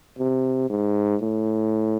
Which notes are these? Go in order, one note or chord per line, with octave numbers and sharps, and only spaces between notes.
C3
G#2
A2